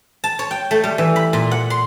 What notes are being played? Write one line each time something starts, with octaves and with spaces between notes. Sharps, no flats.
A5
C#5
G5
A3
G3
E3
B5
A#2
F#5
C6